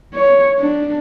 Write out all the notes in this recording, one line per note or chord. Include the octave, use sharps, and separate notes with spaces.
C#5
D4